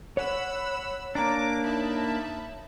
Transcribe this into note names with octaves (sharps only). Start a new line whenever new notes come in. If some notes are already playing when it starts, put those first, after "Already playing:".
C#5 F#5 B5 E6
A#3 D4 A#5 D6
D#4 E5 A5 B5